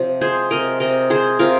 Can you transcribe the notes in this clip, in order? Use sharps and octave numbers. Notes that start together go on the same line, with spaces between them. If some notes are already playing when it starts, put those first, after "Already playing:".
Already playing: C3 F3
G#3 G#4 C5
C3 A#4 D#5
C3 A#4 D#5
G#3 G#4 C5
C3 F4 A#4